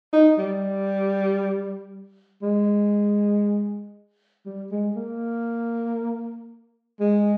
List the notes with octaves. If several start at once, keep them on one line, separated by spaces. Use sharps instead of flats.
D#4
G3
G#3
G3
G#3
A#3
G#3